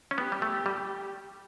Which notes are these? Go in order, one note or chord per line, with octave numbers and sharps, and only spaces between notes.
C#4
B3 G4
G3
A3
G3